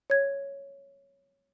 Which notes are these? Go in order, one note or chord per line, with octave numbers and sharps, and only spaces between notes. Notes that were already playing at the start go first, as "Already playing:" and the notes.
C#5 G#6